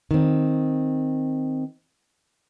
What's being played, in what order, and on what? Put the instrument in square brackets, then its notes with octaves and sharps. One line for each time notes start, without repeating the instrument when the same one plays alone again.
[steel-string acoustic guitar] D#3 C4